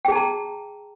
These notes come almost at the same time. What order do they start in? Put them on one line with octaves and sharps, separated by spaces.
G5 G#4 A5 A#5